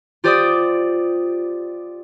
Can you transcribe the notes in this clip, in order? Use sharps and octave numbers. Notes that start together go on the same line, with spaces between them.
F4 G4 C5 D5 D6 D#6